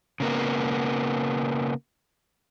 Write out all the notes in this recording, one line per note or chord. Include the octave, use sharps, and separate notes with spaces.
C#3 A#3 B3